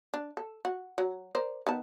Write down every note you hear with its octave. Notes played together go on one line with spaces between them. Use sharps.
D4
A4
F#4
F#3
A#4 C5 D5
D#3 B3 A5